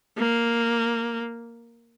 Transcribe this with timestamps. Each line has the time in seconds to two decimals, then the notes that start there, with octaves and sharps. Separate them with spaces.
0.18 A#3